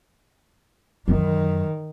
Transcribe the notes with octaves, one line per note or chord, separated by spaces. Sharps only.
F#2 D#3